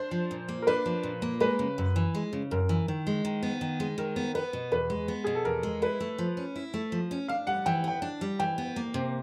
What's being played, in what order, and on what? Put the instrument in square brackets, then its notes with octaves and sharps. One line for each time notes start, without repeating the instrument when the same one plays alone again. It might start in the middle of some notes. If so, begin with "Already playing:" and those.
Already playing: [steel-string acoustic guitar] D4 [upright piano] C5
[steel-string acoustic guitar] F3
A#2
A#3
[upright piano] A#4
[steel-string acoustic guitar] D4 [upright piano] B4
[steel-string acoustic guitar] F3
A#2
A#3
[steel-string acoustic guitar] G#3 [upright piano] B4
[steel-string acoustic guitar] C#3
F#2
E3
G#3
C#3
[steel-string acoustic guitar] F#2 [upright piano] A#4
[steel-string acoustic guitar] E3
D#3
G#3
D#3
B3
D#3
G#3
[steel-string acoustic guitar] D#3 [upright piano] A#4
[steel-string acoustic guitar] B3
[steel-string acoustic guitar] B3 [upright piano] B4
[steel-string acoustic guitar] B2
[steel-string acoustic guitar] E2 [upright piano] B4
[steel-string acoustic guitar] G#3
B3
[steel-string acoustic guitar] B2 [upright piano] G#4
[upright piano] A4
[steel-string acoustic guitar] E2 [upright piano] A#4
[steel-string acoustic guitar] G#3
[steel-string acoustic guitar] E4 [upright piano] B4
[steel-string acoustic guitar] A3
F3
C#4
E4
A3
F3
C#4
[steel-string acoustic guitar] D4 [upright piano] F5
[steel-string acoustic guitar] G3 [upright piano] F#5
[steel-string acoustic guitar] E3 [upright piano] G5
[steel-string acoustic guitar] B3 [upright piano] G5
[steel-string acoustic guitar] D4
G3
[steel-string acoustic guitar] E3 [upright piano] G5
[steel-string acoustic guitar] B3
A#3
C3